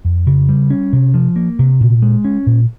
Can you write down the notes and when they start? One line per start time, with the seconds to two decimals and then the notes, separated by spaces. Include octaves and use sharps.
0.05 F2
0.27 C#3
0.49 G3
0.70 C#4
0.92 C3
1.14 F3
1.36 A#3
1.59 C3
1.80 A#2
2.02 G#3
2.25 C#4
2.46 A#2